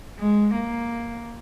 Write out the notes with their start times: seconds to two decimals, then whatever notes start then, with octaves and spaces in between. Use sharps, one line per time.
0.19 G#3
0.55 A#3